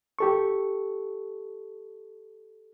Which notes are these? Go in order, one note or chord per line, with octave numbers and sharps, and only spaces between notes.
G4 A4 C#6